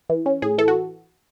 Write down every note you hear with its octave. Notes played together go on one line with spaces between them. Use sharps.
E3
C#4
A2 G#4
E3 A4
F#4